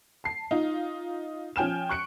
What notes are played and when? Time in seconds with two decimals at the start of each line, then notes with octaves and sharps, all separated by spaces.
0.24 A5 C7
0.51 D#4 F4
1.56 F3 C#4 G5 G#5 F6 E7
1.89 C#6 F#6 C#7 D7